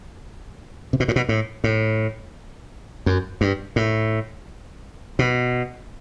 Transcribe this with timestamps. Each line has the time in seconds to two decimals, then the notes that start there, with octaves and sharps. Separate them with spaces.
0.93 C3
1.00 B2
1.08 A2
1.16 B2
1.29 A2
1.64 A2
3.06 F#2
3.41 G2
3.76 A2
5.19 B2